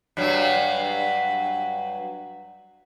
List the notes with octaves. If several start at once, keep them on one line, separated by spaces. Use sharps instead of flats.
G2 F#3